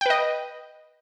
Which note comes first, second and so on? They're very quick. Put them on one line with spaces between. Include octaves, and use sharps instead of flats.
G5 B4 D#5